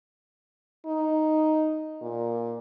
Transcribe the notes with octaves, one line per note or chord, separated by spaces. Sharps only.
D#4
A#2